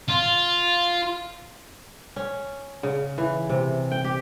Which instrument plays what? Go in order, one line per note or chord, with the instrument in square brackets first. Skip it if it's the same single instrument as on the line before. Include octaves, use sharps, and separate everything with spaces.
[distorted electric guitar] F4
[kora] C#4
C#3
E3
C3
G5
G4